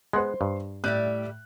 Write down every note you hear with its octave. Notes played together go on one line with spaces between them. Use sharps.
G#3 B3 C5 F#5 C6
G2
A2 G3 D5 E5 F#6